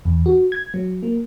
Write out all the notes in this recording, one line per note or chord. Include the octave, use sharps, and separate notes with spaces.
E2
F#4
G#6
F#3
A#3